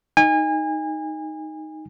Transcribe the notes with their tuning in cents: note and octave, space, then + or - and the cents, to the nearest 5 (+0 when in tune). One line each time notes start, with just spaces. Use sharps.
D#4 +0 G#5 -30